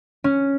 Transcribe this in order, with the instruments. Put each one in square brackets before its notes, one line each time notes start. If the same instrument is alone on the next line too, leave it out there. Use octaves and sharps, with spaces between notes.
[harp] C#4